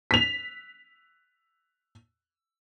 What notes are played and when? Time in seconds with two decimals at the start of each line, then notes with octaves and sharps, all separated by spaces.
0.11 B6 F7